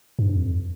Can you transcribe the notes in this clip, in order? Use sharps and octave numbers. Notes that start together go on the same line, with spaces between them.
G2
F2